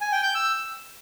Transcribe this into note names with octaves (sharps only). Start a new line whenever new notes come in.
G#5
G5
G6
E6